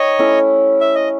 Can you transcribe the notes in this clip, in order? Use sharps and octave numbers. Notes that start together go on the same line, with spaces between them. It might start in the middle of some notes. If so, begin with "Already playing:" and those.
Already playing: D#4 G4 C#5 D#5
A3 C#4 E4
E5
D#5